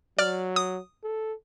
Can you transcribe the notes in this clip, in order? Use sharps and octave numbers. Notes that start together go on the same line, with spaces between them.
F#3 D5 F6
D#6
A4